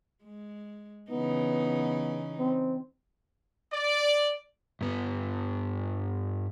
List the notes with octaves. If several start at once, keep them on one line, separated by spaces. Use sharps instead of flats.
G#3
C#3 E3 B3 D#4
C4
D5
G2 B3